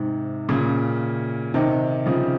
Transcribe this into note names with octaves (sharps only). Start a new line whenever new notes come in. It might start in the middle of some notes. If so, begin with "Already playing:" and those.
Already playing: G#2 C3
A#2 C#3
C3 D#3
C#3 F3